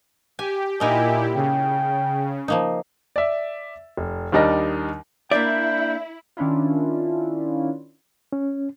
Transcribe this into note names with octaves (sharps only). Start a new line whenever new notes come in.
G4 G#5
A#2 D#4 E4 G4 A#4 D#5 G#5
C#3 G5
F3 A#3 D#4
D5 E5
F1
D#2 G3 D4 D#4 A#4 A#6
A#3 D4 E4 D5 E5 G5
D#3 C#4 D4 E4 F4
C#4